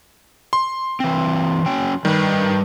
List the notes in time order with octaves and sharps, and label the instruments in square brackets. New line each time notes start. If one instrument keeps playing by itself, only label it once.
[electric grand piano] C6
[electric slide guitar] E3 C4
F#3 C#4 G5
[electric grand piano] D#3 [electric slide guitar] G3 B4